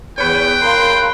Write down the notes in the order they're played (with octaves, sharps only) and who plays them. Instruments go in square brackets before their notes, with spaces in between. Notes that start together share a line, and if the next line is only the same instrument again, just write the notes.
[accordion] E2 [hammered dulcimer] B4 C#5 [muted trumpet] G5
[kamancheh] A#4 F5 [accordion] C6